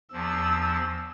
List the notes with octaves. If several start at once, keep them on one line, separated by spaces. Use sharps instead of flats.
E2 F3 E6